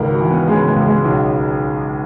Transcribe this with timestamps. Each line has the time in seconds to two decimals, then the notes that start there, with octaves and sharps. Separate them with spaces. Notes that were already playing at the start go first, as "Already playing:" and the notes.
Already playing: G#1 C#2 A#4
0.10 F#4
0.20 E3
0.29 B3
0.48 C#3 G#3
0.67 G#3
0.76 C#2
0.86 G#3
1.05 B1